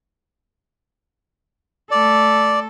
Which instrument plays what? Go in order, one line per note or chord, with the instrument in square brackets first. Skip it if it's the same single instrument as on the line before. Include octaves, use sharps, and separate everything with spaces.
[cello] A3 A4 [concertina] D5